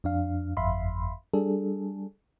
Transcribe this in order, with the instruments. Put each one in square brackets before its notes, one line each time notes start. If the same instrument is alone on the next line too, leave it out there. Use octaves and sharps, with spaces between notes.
[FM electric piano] F2 D4 F5
G1 F2 E5 F5 B5 C6
G3 D4 G#4 A4